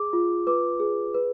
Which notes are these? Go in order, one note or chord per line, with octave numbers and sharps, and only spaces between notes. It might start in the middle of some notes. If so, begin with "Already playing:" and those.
Already playing: G#4 D6
F4
B4 D6
G#4
B4